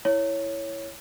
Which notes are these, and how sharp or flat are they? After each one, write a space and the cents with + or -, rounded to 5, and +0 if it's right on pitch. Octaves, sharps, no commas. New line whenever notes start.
E4 +0 C#5 +0